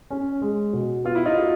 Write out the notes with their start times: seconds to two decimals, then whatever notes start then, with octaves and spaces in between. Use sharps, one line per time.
0.10 C#4
0.41 G#3
0.73 B2
1.04 B3 F4
1.15 E4
1.25 D#4 F4
1.37 F#4